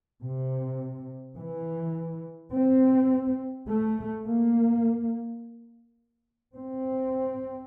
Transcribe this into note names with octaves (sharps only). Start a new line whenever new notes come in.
C3
E3
C4
A3
A#3
C4